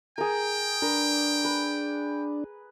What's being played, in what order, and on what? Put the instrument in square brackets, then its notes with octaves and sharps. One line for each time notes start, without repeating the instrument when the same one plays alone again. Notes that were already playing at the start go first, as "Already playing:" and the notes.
[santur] G#4 A#4 [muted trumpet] G5
[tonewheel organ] D4 [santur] A#4 B4
[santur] B4